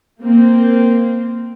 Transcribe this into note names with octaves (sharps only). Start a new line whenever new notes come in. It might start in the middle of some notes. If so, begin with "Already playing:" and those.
A#3 C4